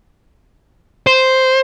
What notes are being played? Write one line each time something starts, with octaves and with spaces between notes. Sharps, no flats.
C5